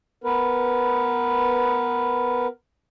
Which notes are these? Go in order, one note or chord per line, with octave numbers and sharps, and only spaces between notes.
B3 A#4 B4